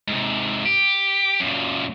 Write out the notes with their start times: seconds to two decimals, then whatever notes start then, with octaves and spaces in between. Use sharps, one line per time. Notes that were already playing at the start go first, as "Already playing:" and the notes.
0.08 G#2 C3
0.65 G4
1.40 F#2 A#2